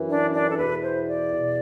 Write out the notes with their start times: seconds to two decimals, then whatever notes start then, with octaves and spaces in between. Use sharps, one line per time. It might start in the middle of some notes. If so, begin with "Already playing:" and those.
Already playing: F#2 E3
0.09 D4
0.33 D4
0.49 A4
0.58 E2 B2 B4
0.83 C5
1.07 D5
1.32 E2 B2